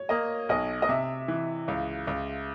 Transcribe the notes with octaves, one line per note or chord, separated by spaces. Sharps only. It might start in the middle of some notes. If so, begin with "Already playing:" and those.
Already playing: C#5
A#3 D#5
B1 D#5
D#5
C3 E5
E3
C#2 F5
C#2